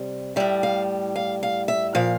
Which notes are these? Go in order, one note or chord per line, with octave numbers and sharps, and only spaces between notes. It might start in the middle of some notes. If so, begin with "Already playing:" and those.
Already playing: C3 G3
A2 G3 E5
F5
F5
F5
E5
A#2 F3 F5